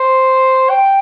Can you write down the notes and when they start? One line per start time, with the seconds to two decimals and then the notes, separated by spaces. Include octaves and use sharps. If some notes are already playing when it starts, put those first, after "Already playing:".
Already playing: C5
0.70 G5